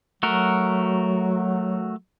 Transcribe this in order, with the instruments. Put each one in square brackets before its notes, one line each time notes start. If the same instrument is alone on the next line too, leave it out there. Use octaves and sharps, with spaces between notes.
[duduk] F#3 [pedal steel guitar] A3 F#4 A#4